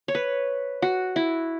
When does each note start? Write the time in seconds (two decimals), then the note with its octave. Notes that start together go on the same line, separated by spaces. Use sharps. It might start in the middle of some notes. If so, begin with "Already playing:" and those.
0.08 C#5
0.15 B4
0.82 F#4
1.16 E4